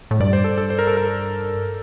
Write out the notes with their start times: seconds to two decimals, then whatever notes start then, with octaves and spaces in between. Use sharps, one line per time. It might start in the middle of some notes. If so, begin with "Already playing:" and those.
0.11 A2
0.20 G2 D5
0.33 C5
0.44 A4
0.58 A4
0.70 C5
0.79 A#4
0.87 A4
0.97 A#4